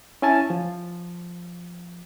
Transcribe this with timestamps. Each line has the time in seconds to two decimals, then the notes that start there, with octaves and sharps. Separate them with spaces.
0.22 C#4 E4 G#5 A5 A6
0.50 F3